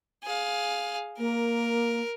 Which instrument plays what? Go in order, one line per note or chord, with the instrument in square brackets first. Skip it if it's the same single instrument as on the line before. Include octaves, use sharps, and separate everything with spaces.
[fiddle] G#4 F5
[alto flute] A#3 [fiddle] A#4